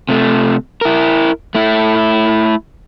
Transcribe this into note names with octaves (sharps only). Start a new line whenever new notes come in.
C3 A3
E4 A#4
A3 E4